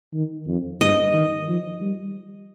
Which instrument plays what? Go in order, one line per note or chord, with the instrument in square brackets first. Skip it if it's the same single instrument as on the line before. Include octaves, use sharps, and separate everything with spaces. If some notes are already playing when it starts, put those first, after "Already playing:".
[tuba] D#3
F2
[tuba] G2 [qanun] D#5
[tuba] D#3
F3
G3